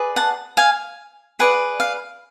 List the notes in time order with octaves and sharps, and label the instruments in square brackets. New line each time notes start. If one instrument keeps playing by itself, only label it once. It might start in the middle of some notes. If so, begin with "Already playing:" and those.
Already playing: [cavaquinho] G#4 B4 D5
F#5 A5
F5 G#5
G#4 B4 D5 F#5
F5